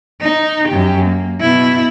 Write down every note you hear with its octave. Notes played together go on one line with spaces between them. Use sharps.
D#4
F#2 G4
A#3
B2 E4